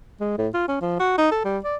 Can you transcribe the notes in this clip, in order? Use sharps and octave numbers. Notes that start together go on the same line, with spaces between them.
G#3
A2
F4
C#4
F3
F#4
D#4
A4
G3
D5